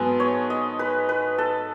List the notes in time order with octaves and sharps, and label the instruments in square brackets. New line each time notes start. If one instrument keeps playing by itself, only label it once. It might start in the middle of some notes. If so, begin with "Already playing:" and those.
Already playing: [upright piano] G#2 F#3 B3 [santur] G#4 A4 B4
[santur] C#5
D#5
B4
B4
A4